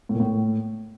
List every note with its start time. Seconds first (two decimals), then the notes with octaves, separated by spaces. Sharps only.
0.09 A2
0.15 A#2
0.20 A2